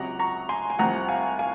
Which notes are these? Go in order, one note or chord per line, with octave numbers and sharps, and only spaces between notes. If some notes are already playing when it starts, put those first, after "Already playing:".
Already playing: C#2 C3 F#3 F#5 A#5
A#5 C#6
G#5 C6
G#5
C2 C3 F3 F#5 A#5
F5 G#5
F5 G#5